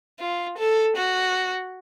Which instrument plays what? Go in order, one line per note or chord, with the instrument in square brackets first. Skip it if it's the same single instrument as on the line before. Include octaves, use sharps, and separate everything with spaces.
[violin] F4
A4
F#4